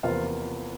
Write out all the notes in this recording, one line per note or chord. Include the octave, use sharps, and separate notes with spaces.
E2 C3 F3 A#3 F4 F5